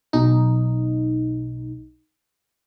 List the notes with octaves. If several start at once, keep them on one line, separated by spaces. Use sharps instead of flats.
B1 D#4